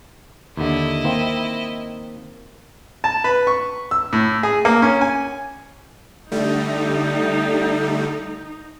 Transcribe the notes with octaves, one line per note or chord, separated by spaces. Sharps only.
D#2 D3 E4 D#5
D#3 A#3 C4
A5
B4
C#6
E6
A2
G#4
A#3
C#4
G#5
D3 G3 A3 D#4